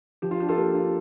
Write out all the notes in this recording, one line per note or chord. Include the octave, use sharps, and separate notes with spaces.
F3 G4
F4
D4 G4
F4 A4
A#3 G4
F4